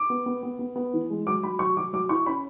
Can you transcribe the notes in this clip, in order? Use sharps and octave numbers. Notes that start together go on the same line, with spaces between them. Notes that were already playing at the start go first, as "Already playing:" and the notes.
Already playing: D6
B3
B3
B3
B3
B3
E3
G#3
F#3 D6
F#3 B5
F#3 C#6
F#3 D6
F#3 D6
E4 C#6
C#4 B5